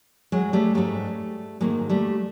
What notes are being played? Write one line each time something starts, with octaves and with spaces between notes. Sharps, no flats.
F#3 G#3
G3 A3
G#2 D#3 F#3 G3 A3
G#2 D#3 F#3 G#3 A#3
G3 A3